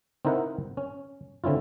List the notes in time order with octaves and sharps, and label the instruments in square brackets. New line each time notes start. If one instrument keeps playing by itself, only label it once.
[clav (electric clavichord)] C4 D#4 E4 A#4 C5 F#5
C#4
D3 C4 C#4 E4 F4